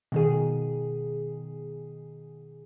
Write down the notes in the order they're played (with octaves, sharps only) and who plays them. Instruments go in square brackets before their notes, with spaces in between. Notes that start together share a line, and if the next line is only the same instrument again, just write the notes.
[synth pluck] B2 D#3 G#4